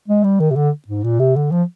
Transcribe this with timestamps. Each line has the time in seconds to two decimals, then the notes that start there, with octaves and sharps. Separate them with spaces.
0.08 G#3
0.24 G3
0.40 D#3
0.51 C3
0.56 D3
0.88 G#2
1.04 A#2
1.19 C3
1.36 D3
1.51 F3